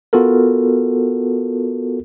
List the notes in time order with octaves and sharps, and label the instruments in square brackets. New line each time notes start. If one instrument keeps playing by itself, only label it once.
[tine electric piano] B3 F4 F#4 A4 A#4